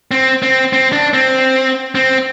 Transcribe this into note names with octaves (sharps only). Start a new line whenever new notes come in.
C4
C4
C4
D4
C4
C4